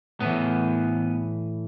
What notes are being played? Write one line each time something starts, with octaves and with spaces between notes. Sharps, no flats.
A2 E3 B3